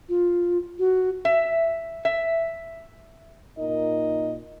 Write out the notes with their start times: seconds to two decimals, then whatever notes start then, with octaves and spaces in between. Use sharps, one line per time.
0.09 F4
0.79 F#4
1.25 E5
2.05 E5
3.58 A#2 D#4 A#4 D#5